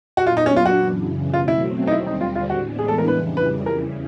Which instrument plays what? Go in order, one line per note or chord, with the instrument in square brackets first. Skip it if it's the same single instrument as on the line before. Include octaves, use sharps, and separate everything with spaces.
[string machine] A#2 F#3 B3 D4 [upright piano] F#4
[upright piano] F4
D#4
C#4
F4
F#4
[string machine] F#2 C#3 E3
[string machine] B2 F#3 A3 C4 [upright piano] F4
[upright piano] E4
D#4
[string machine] D#2 D3 G3 C4 [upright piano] E4
[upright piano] D#4
F4
F4
[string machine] A2 E3 G#3 B3 D4 [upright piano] F#4
[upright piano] G#4
A4
A#4
[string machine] F2 C#3 E3 G3 [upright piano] B4
[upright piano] B4
[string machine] E2 C#3 E3 [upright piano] A#4